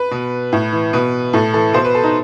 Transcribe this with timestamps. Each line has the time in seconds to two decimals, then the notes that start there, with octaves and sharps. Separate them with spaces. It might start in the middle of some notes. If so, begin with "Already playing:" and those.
Already playing: B4
0.11 B2
0.52 A2
0.72 E3
0.93 B2 B4
1.33 A2 A4
1.54 E3 A4
1.73 B2 C5
1.84 B4
1.95 A4
2.04 D#4